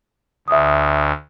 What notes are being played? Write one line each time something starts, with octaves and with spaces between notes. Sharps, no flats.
D2 E5 D#6